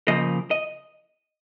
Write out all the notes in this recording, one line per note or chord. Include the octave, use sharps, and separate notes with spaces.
C#3 F3 A#3 D#5
D#5